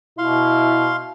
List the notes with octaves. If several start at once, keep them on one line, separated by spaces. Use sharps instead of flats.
B2 E4 F5 C6